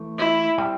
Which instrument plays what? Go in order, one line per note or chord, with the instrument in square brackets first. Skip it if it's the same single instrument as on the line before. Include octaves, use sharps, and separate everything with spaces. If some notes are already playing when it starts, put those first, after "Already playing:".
Already playing: [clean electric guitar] E3 A3
[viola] E4
[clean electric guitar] G3 C4